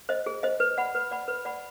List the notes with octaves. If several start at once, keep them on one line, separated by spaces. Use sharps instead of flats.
C5 D#5
G#4
C5 D#5
B4
D5 F#5 B5
B4
D5 F#5 B5
B4
D5 F#5 B5